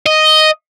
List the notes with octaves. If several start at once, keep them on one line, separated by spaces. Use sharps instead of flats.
D#5